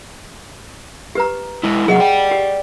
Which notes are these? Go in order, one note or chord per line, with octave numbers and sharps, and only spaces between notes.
G4 B4 A#5
G#3 E4
C2 F#3 G#4 D#5 F#5
D5 G5
G4